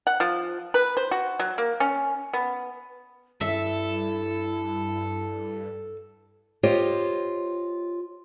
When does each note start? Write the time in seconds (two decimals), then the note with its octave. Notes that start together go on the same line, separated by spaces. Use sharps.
0.07 F#5
0.20 F3
0.74 B4
0.97 C5
1.11 F#4
1.40 F#3
1.58 A#3
1.80 C#4
2.33 B3
3.41 G2 E4 A4 E5
6.63 F4 G4 C5 C#5 D#5